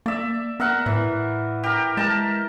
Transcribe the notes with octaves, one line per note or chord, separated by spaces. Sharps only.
A#3 D5 E5
B3 A#4 E5 F#5
A2 E3
G4 A#4
G#3 A#4 A5